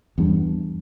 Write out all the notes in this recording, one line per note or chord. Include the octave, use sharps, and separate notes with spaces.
E2 G2